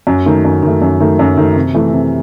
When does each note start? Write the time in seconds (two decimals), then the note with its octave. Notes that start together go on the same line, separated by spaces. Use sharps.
0.07 F#2
0.26 D#3 A3
0.45 F#2
0.63 D#3 A3
0.82 F#2
1.00 D#3 A3
1.19 F#2
1.37 D#3 A3
1.56 C3
1.74 E3 A3
1.92 C3